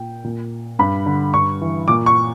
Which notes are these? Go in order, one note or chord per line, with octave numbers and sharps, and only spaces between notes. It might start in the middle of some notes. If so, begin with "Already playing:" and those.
Already playing: A#2 G5
A#2
G2 B5
D3
G2 C#6
E3
A#2 D6
C#6